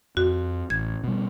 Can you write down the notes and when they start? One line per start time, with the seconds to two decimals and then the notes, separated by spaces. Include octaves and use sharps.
0.17 F2 F#4
0.70 A1 G#6
1.04 B2 G3